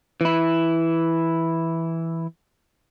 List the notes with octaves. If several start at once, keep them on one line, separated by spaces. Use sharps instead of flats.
E3 E4